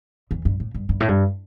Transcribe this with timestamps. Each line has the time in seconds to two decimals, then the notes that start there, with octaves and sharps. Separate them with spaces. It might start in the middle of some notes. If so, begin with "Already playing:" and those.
0.31 E2
0.45 G2
0.60 A2
0.74 G2
0.89 G2
1.00 A2
1.08 G2